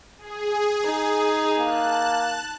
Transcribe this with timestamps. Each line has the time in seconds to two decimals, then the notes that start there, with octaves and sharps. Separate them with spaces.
0.18 G#4
0.85 D#4
1.59 A#3 A5 F#6